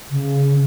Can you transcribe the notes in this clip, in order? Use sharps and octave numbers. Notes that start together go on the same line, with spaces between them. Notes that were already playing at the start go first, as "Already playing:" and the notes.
C#3